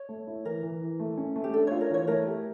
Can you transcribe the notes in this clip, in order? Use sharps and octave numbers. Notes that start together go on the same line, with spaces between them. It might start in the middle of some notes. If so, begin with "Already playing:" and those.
Already playing: C#5
A3
E4
E3 A#4
E3
E3
A3
C#4
A3
G4
D4 A4
F4 C#5
A#4
E3 C#5
A3 A#4
G4